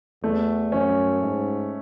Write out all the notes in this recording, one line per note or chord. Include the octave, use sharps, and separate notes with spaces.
E2 A3
F#2 C#4
G#2